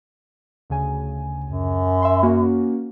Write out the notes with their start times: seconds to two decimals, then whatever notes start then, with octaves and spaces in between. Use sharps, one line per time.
0.70 D2 C#3 G#5
1.44 F#2
2.02 E5 C6
2.23 A#3 C#4 F#4